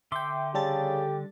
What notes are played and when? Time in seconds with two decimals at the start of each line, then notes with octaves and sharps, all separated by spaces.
0.12 D3 E5 G5 C6 D6
0.54 C#3 G3 G4 A4 A6